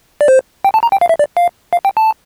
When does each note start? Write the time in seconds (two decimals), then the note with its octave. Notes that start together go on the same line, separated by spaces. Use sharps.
0.21 D5
0.28 C5
0.65 G5
0.74 A5
0.83 A#5
0.92 G5
1.01 F5
1.09 E5
1.19 D5
1.37 F5
1.73 F5
1.85 G5
1.97 A5